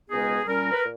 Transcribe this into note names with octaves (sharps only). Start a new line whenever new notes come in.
C#2 B2 G#3 B3 D#4 G#4
A#2 G3 C#4 A#4
B4
A#2